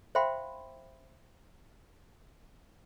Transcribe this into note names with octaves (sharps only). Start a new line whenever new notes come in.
C5 E5 F5 G5 B5 C6